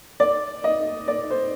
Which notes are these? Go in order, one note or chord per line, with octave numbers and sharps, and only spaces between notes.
D5
D#5
D5
C5